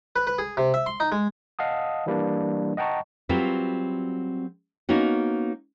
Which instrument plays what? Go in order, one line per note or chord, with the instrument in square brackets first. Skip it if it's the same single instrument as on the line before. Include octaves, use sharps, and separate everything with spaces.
[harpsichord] B4
B4
G#4
C3
E5
C6
D#4
G#3
[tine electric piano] D#5 F5 F#5 A5 D#6
E3 G3 A#3 D4
D#5 F#5 G5 A5 A#5 C#6
[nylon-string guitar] F#3 G3 C4 F4 A#4 B4
A#3 B3 C#4 D#4 F#4